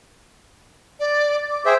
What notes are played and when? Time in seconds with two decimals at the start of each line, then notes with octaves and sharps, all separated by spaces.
1.00 D5
1.50 D6
1.66 G#4 C5 E5 G5